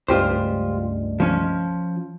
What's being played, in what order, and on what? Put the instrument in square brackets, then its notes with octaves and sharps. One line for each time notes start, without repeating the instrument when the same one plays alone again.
[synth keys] C#2 G2 [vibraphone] A3 D5 D#5 [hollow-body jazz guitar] F4 G4 C5
[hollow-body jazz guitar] F3 C#4